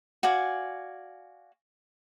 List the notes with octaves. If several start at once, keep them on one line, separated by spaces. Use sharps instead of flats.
F#4 D5 F5 G#5